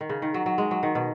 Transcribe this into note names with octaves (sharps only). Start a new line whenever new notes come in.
D#3
C#3
D#3
F#3
F#3
G#3
F#3
D#3
B2